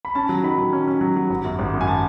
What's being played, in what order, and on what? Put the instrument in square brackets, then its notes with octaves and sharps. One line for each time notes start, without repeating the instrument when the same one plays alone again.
[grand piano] B5
C#4 A5
F#3
D#3 B5
F#3
C#4
C#4
F#3
F#3
G#1
F#2
G#1
F#2
G#5
A5